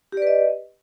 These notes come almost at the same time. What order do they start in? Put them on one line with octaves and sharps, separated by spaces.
G4 D5 B4 D#5